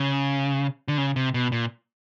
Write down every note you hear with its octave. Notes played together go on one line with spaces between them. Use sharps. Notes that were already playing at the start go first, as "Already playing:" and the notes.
Already playing: C#3
D3
C#3
C3
B2
A#2